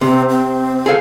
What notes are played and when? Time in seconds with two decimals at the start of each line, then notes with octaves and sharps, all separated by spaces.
0.01 C3 C4
0.30 C4
0.86 G#4 A4 F5